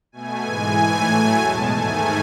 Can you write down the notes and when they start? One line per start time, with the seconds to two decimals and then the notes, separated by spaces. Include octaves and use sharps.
0.12 B2 A3 G#5
0.44 G#2 E3 G#3
0.74 A2 E3 A3
1.06 A2 F#3 A3
1.37 E2 B2 G#3 A5
1.68 G#2 D#3 A3 G#5